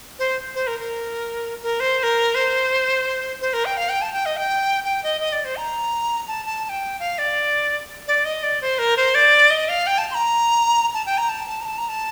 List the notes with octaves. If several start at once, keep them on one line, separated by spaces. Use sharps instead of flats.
C5
C5
A#4
A#4
A#4
C5
C5
A#4
C5
C5
A#4
G5
F5
G5
A5
G5
D#5
G5
G5
D#5
D#5
D5
C5
A#5
A5
A5
A5
G5
F5
D5
D5
D#5
D5
C5
A#4
C5
D5
D#5
F5
G5
A5
C6
A#5
A5
G5
A#5
A5
A5
A#5
A5
A#5
A5